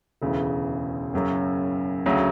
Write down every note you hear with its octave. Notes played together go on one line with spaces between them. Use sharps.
E1 D2 C#3 E3
F#1 F#2 C#3 F#3
D2 C#3 F#3